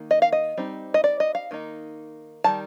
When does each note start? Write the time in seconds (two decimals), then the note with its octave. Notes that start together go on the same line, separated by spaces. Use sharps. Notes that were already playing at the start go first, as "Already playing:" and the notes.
Already playing: D#3 A#3
0.11 D#5
0.22 F5
0.33 D#5
0.57 G3 C4 D#4
0.94 D#5
1.04 D5
1.20 D#5
1.35 F5
1.51 D#3 A#3 D#4
2.44 D#3 G3 A5